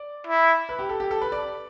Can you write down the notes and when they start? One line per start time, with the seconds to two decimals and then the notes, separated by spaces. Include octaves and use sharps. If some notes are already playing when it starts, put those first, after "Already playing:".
Already playing: D5
0.27 E4
0.69 B4
0.79 G4
0.89 A4
1.00 G4
1.11 A4
1.22 B4
1.32 D5